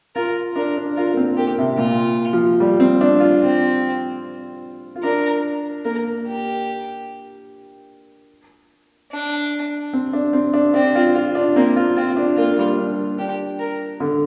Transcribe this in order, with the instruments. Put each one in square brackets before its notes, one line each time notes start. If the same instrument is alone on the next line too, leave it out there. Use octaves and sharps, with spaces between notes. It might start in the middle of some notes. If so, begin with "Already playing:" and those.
[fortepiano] F4 [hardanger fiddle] A#4
[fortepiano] D4 [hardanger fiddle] A#4
[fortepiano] D4
[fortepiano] F4 [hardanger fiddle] A#4
[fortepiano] A#3
C4
[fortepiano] A#3 [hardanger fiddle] G4
[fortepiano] C3
[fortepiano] A#2 [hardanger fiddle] F4
[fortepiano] F3
G3
C4
D4
F4
[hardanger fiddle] C4
[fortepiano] F4
[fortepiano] D4 [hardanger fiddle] A#4
[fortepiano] A#3 [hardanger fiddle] A#4
[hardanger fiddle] G4
D4
[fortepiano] C4
D4
C4
D4
[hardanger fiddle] C4 [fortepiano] D4
[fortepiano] F4
F4
D4
[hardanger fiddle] A#3 [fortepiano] C4
[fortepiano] F4
[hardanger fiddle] C4 [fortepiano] F4
[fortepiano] D4
[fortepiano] A#3 [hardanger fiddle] F4
[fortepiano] A#3
G3
D4
[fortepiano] D4 [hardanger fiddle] G4
[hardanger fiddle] A#4
[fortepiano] D3